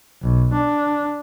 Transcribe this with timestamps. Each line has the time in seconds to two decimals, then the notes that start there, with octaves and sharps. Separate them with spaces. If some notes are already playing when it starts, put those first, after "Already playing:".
0.23 B1
0.53 D4